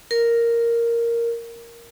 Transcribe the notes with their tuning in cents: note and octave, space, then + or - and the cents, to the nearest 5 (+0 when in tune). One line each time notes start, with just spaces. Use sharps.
A#4 +0